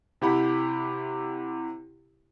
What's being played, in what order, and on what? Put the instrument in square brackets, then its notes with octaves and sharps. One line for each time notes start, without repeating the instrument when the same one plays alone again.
[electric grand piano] C3 E4 G4 F#5 B5